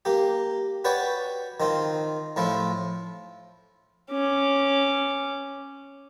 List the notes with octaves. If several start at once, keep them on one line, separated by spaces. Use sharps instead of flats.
A#3 G4
F#4 B4 C#5 D5 G5
D#3 C4 F4
A2 F3 E4 F4
C#4 D6